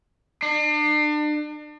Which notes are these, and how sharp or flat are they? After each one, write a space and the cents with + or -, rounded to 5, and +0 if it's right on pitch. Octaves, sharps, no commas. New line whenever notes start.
D4 +35